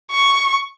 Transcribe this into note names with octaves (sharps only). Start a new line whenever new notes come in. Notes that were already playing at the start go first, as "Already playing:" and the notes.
C#6